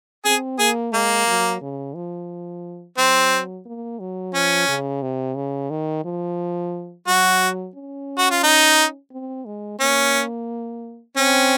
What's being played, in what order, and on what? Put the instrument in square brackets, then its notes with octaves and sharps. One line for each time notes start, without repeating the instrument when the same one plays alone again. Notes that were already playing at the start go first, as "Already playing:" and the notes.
[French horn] C4 [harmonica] G#4
[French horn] A#3 [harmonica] G#4
[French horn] G#3 [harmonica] A#3
[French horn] F#3
C#3
F3
[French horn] F#3 [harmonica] C4
[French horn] A#3
F#3
[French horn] F3 [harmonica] C#4
[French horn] C#3
C3
C#3
D#3
F3
[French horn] F#3 [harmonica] F#4
[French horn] C#4
[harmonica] F#4
F4
D#4
[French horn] C4
G#3
[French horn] A#3 [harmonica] C#4
[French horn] C4 [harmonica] C#4